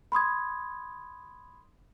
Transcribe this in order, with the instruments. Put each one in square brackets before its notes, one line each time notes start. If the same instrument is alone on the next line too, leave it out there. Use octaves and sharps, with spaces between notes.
[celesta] B5 C6 D#6 G#6